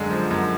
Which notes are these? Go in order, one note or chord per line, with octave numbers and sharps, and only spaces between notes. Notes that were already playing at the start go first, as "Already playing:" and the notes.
Already playing: F#2 D3 G#3
F3
F#2